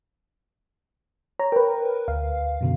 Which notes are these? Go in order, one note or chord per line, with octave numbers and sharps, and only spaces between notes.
C#5 A#5
A#4 B4 G5
D2 F5
F#2 B2 D3